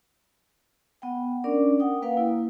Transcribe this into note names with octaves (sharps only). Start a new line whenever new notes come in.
B3 F#5 G5
C#4 D4 A#4 D5
F#5 G5 D#6
A#3 B4 F5 G5
A#3 E4